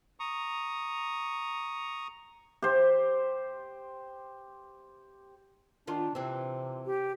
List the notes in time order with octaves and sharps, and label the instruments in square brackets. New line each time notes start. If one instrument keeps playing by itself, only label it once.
[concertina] A#5 C#6 D#6
[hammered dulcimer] G4 C5
[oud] D#3 F4 [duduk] D4
[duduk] C3 [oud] E3 C4
[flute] G4